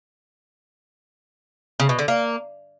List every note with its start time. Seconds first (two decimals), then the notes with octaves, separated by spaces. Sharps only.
1.80 C#3
1.89 B2
1.99 D3
2.08 A#3